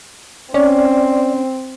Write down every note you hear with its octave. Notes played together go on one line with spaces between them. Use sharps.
C4 C#4 D5